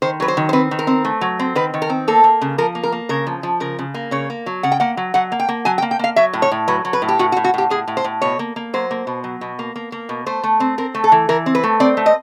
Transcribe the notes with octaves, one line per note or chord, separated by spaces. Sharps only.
D#3 C5
F#3 B4
C5
D#3
C5
C4 B4
D#3
A#4
C4
A3
F#3
C4
D#3 B4
D#3
A#4
C4
A#3 A4
A#3
C#3
F3 A#4
A#3
A#4
A#3
C#3 A#4
F3
F3
C#3 A#4
C#3
A#3
C#3 C#5
A#3
F#3
C#3 F#5
G5
A#3 F#5
F#3
F#3 F#5
A#3
G5
A#3
F#3 G#5
G5
A#3
G5
A#3 F5
F#3 E5
A2
C#5
A2
F#3 B4
F#3
B4
A2
G4
A2 F#4
F#4
A2
F#4
A2 G4
A2 G#4
A2
C5
A2
B2 C#5
A#3
A#3
F#3 C5
A#3
B2
F#3
B2
A#3
A#3
A#3
B2
A3 C5
A3
C4
C4 A#4
A3
A4
E3
E3 A#4
C4
B4
A3
C4 D5
A3
D#5